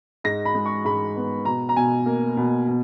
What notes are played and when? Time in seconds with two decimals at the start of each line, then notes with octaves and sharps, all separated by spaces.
0.24 G#2 A#6
0.45 B5
0.55 G#3
0.66 C#6
0.85 G#2 B5
1.16 B3
1.45 B2 A#5
1.69 A#5
1.76 B2 G#5
2.06 A#3
2.37 B2
2.68 B2